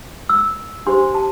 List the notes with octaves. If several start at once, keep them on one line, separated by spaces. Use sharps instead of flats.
E6
D4 G4 C5 C6
A5